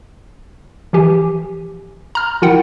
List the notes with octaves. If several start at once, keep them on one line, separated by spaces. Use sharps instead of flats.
E3 F3 G4 G#5
A#5 F6
F3 E4 F4 A#4 F#5 G5